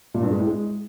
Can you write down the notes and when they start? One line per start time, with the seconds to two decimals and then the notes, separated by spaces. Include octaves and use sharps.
0.14 A#2
0.23 G2
0.31 G#3
0.39 A2
0.47 G#3